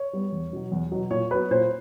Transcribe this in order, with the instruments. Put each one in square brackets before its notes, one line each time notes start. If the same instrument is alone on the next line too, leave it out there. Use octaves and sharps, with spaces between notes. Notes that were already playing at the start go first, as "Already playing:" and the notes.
Already playing: [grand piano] C#5
G3 B3
E2
B2 F#3
E2
B2 F#3
A#2 C#5
F#3 B3 B4
A#2 C5